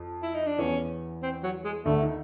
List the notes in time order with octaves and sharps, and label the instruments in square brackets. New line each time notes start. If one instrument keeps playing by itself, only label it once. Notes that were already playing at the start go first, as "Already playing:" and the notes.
Already playing: [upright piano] F2
[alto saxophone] E4
D#4
D4
[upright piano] E2 E3 [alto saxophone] C#4
[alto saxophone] C4
F#3
G#3
[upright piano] D2 D3 [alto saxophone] A3
[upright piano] D#3